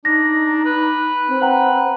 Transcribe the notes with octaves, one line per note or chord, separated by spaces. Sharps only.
D4 D#4 A#6
B4
C4
B4 F#5 G5 A#5